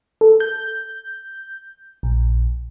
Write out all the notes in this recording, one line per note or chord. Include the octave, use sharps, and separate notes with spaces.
A4
G6
A#1